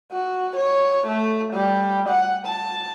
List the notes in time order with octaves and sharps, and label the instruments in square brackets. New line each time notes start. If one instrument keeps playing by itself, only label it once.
[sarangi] F#4
C#5
A3
G3
F#5
A5